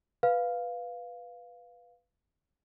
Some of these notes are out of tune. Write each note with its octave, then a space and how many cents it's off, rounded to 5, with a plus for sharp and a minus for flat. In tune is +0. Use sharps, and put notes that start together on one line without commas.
B4 +0 F5 +0